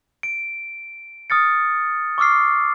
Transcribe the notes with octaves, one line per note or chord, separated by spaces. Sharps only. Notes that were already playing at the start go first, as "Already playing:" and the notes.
D7
D#6 F6 A6 C#7
C#6 D6 E6 F6 C7